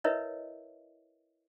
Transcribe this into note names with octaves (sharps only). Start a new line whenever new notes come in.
E4 A#4 B4 C#5 D#5 E5